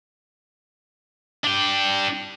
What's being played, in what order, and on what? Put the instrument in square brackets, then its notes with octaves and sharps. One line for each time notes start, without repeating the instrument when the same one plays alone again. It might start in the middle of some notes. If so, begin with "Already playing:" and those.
[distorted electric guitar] D4 G5